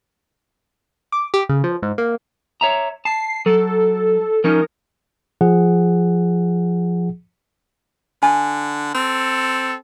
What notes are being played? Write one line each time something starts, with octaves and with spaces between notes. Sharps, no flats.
D6
G4
C#3
F3
G#2
A#3
C#5 E5 A#5
A5 C7
F#3 A4
F3 C#4 D#4 A#4
F3 G#4 F#5
D3 G#5
C4 A4